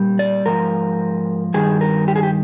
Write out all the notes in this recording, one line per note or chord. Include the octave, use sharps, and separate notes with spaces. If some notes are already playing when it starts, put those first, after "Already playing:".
Already playing: A#2 G3
D5
G#2 F3 A#4
G2 D#3 G3 G#4
A#4
G4
G#4
G4